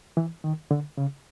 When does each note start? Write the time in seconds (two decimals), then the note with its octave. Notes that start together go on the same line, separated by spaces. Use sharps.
0.17 E3
0.44 D#3
0.71 D3
0.97 C#3